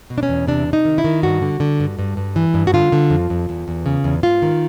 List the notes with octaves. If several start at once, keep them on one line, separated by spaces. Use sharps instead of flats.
B2
D4
C#4
E2
C3 D4
C3
D#4
D#3
E4
D#3
G2 F#4
D3
D3
G2
G2
G2
E3
G2
F#4
D3 F4
D3
F2
F2
E2
E2
C#3
E2
G#2 F4
D#3